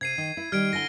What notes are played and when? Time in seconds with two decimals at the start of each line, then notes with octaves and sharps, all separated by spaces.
0.01 C3 G#6 C7 D#7
0.18 D#3
0.37 E4
0.52 D#3 G3 F6 G#6 D7
0.73 D3 E4 G#5 A#6 G7